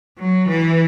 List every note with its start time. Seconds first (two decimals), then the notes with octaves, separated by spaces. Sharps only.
0.19 F#3
0.49 E3